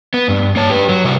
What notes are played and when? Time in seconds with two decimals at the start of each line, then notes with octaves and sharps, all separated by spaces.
0.14 B3
0.29 G2
0.56 A#3 C#5 A5
0.70 G4 B4
0.89 F#3
1.05 C3 G3 F#4 A#4